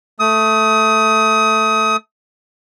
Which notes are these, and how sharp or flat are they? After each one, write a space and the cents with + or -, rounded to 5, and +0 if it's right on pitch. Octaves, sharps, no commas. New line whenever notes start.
A3 +0 D#6 +25